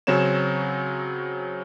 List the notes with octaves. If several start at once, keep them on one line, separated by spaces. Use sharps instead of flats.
C#3 F#3 C4 C#5 E7